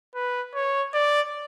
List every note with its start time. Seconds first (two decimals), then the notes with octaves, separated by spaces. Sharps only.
0.15 B4
0.55 C#5
0.94 D5